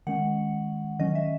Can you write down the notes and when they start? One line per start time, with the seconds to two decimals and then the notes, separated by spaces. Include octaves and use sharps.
0.07 D#3 G#3 C#4 F#5
0.99 D#3 F#3 C#4 D#5
1.15 E5